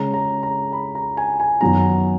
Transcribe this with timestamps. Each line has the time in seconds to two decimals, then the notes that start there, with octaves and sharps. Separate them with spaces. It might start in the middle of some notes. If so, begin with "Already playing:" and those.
Already playing: C#3 G#3 C#4 A#5
0.14 A#5
0.43 A#5
0.72 B5
0.95 A#5
1.17 G#5
1.40 G#5
1.61 F#2 D#3 F#3 B3 A#5